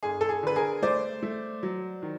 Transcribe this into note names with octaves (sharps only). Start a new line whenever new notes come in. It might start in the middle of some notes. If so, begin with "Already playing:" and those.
G1 G#4
A4
G#4
D3 B4
G#4 A#4
A3 C5 D5
A3
F#3
D#3